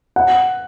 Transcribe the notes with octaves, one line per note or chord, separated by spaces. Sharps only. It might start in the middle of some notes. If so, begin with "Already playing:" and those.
F#5